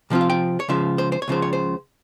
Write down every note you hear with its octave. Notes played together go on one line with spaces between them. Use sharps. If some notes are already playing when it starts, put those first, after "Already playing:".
C3 F3 C4 F4
F5
G5
C#5
C#2 C#3 F3 E5
C5
C5
C#5
C#2 C#3 F3 C5
C#5
C5